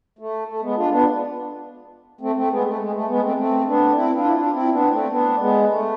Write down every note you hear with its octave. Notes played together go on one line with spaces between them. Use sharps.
A3
A3
G#3 B3
D4 F4
B3 D4
A3 C4
A3 C4
G#3 B3
A3
G#3
A3
G#3 B3
A3 C4
A3 C4
B3 D4
C4 E4
D4 F4
E4
D4 F4
F4
C4 E4
B3 D4
A3 C4
B3 D4
G#3 B3
A3